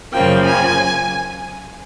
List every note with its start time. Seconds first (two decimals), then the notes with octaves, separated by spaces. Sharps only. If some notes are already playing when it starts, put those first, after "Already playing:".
0.12 F#2 C#3 F3 A#3 G5
0.46 G#5